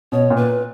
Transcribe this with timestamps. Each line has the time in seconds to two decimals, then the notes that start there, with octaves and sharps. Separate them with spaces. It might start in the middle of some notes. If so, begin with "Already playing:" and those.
0.12 B2 C#5
0.30 A#2
0.36 B4